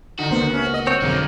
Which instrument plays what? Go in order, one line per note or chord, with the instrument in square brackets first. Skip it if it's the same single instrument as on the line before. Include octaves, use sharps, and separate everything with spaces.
[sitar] D3 D#4 [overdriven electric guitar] F#4
[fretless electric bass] C#2 A#3 B3 [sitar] D3 C5
[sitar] C3 C#4
D#5
[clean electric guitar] C4 C#5
[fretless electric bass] B1 F2 [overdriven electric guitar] D3 G#3 [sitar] A#3